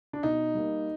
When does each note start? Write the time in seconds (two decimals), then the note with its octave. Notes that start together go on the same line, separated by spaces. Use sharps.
0.13 D4
0.23 B2 D#4
0.55 G3 A#3